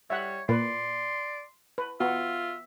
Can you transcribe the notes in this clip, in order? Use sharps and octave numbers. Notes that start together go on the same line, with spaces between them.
G3 C#5 E5 F#5
A#2 B4 D5 C6
B4
B3 F4 F#4 E5